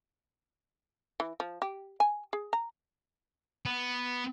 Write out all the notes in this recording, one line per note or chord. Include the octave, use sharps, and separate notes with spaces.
E3
F3
G4
G#5
G#4
A#5
B3